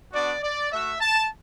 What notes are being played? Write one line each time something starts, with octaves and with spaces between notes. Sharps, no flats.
B3 D4 F#4 D5
D5
A3 F#4 E5
A5